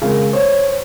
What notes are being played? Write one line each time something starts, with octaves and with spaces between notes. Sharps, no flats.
C#3 G#3 A#4
C5 C#5